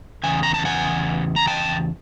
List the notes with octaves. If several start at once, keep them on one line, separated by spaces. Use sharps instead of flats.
E2 C#3 G#5
A#5
A5
F#5 G#5
A#5
G5 A5